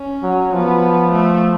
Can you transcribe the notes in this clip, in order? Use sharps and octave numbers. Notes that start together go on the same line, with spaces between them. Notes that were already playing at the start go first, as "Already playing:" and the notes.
Already playing: C#4
F#3
F3 B3
A3